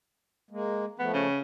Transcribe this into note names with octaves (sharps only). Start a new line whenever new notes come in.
G#3 A#3
F3 A3 B3
C#3